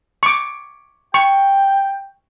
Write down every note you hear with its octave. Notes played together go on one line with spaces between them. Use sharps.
C#6 D6
G5 C#6